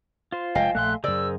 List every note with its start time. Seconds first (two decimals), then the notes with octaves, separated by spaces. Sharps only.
0.32 F4 C5
0.55 F1 G#3 D#5 F5 G5 G#5
0.75 A#1 A3 E5 C6 F#6
1.04 F#2 C#3 G#4 A#4 C5 D5 E6